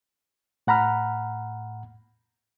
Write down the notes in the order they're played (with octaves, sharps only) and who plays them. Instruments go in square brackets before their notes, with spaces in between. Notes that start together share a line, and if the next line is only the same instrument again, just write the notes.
[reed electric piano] A2 F#5 A#5 B5 F6